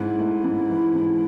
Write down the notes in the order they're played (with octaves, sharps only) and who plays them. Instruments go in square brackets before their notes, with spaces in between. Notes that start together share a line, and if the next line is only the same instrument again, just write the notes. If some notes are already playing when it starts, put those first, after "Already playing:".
Already playing: [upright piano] G#2 [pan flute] E4
[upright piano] A3
G#2
E3
G#2